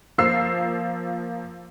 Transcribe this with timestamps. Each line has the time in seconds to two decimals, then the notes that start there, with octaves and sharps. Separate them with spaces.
0.18 F3 A#3 E6 C7